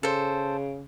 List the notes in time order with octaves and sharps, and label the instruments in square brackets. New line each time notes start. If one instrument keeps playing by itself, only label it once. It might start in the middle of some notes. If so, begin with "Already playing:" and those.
[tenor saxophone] C#3 [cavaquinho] A4 C5